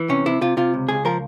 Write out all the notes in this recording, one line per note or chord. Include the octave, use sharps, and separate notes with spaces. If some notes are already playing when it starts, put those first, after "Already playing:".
Already playing: E3
C3 C#4
C3 E4
C3 F4
C3 F4
C#2
C#2 G#4
F3 A#4